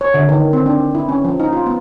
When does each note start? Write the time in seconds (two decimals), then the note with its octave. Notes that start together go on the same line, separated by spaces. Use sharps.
0.01 C#5
0.14 D3
0.29 D#3
0.53 C4
0.66 D4
0.95 E4
1.09 C#4
1.25 F3
1.40 D#4
1.53 F4
1.66 B3